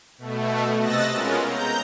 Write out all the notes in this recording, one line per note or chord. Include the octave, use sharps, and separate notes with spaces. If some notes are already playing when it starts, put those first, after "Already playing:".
B2 A3
C3 D#5 E6 F#6 A6 A#6
G#3 B3 C#4 F4 A#4
A#5 G6